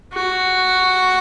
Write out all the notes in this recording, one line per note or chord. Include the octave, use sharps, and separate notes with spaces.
F#4